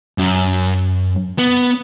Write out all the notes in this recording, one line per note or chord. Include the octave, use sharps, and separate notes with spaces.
F#2
B3